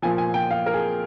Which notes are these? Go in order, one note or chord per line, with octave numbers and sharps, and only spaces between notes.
A#2 F3 G#5
G#5
G5
F5
A#4
G#4